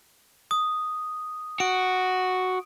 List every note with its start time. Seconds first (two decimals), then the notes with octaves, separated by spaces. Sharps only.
0.51 D#6
1.60 F#4 D7